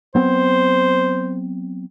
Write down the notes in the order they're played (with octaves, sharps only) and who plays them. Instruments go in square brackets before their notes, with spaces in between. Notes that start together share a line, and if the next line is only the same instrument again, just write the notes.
[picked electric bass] F#3 B3 C4 [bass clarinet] C5